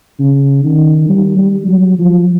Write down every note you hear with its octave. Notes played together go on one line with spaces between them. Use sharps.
C#3
D#3
G3
G3
F#3
F3